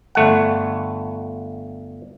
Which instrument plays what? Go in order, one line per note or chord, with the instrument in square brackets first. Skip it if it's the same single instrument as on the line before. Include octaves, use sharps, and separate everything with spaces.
[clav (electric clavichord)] G1 A3 F#5